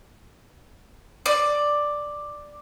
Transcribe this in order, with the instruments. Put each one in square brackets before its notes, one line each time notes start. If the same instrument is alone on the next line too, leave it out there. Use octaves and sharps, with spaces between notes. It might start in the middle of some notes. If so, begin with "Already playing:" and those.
[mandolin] D5